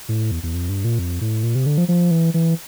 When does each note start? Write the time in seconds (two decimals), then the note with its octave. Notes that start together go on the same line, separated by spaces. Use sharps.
0.09 A2
0.31 E2
0.43 E2
0.54 F2
0.69 G2
0.84 A#2
0.99 F2
1.21 A2
1.43 A#2
1.55 C3
1.66 D3
1.78 F3
1.88 F3
2.11 E3
2.34 E3